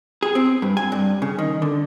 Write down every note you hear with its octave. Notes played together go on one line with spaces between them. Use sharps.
G#4
C4
G2
G#5
G2
C#3
D#3
D3